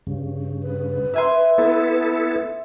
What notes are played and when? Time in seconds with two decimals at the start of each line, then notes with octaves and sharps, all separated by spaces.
0.07 G2 C#3
0.63 B4
1.14 E5 G#5 C6
1.58 B3 E4 A4